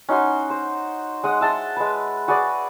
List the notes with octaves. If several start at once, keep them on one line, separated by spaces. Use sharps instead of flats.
C#4 D#4 F#4 C6
C5
G#3 D#5 F#5
E5 A5 C6 D#6
G#3 B4
F#4 G#4 B4 D5